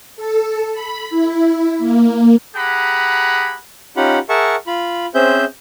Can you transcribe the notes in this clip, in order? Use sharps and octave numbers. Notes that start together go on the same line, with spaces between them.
A4
B5
E4
A#3
G4 G#4 F#5 A#5 B5
C#4 D#4 F4 G4 F#5 B5
G#4 A#4 E5 F#5 A5 C#6
F4 B5
C4 C#4 G#4 C5 E5 G6